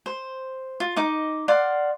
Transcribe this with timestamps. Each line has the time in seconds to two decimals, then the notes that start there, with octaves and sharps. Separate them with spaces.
0.06 C5
0.80 F4
0.96 D#4 D#5 D6
1.48 D5 F5 F#5 C6